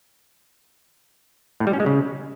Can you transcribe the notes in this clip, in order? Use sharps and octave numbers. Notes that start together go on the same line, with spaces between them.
A2
G3
C#4
G#3
C#3